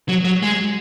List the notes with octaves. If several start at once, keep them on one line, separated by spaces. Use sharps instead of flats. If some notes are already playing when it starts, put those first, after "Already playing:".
F#3
F#3
G#3